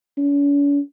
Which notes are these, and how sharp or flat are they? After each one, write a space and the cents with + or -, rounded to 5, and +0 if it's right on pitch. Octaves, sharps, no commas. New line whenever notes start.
C#4 +45